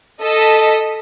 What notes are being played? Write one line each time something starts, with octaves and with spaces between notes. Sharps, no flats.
A4 D#5 B6